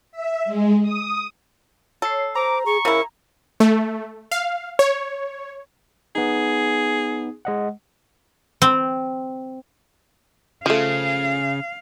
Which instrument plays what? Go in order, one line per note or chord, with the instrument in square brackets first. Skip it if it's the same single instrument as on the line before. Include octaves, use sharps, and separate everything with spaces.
[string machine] E5
G#3
D#6
[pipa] A4 [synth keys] C#5 C7
[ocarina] C5 [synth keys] A#5 [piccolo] D6
[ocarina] G#4 [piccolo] C#6
[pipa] C#3 E4 [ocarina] A#4
[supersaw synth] A3
F5
C#5
[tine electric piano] B3 D#4 [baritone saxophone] G#4
[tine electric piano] G#3 D#5 F#5
[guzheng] C4
[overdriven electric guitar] C#3 [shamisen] F3 A3 [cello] F5